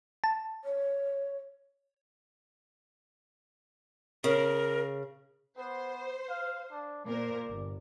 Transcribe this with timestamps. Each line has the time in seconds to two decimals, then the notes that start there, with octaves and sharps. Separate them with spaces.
0.24 A5
0.64 C#5
4.24 C#3 A#4
5.58 B3 C5
6.29 F5
6.72 D4
7.06 A#2 A#4 C5 D5
7.48 G1